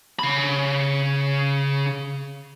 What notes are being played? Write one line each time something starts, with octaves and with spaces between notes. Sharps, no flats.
C#3 B5